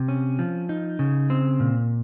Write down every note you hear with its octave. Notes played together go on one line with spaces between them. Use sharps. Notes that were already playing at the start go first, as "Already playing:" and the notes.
Already playing: C3
C#4
F3
D#4
C#3
C4
A#2